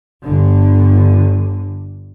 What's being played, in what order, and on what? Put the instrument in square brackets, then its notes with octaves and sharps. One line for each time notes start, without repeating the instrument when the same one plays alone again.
[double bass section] G1 D3